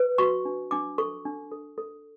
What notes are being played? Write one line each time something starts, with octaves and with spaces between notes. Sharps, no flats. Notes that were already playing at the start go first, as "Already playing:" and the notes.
Already playing: B4
F#4 C#6
D4
D4 D6
A4 C#6
D4
A4
A4